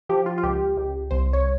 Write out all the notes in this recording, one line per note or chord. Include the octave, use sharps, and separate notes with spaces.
F3 G4
F4
F4
C#2 G4
C#2
C2 C5
C#5